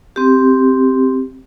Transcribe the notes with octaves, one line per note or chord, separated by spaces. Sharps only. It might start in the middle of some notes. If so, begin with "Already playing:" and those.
C4 G4